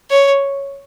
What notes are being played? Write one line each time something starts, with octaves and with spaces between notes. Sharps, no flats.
C#5